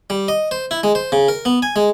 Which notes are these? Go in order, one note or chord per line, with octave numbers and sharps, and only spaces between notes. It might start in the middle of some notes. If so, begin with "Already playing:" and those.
G3
D#5
C5
E4
G#3
C5
C#3
A#4
B3
G#5
G#3